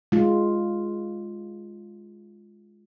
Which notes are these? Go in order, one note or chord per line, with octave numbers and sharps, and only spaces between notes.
G#3 F4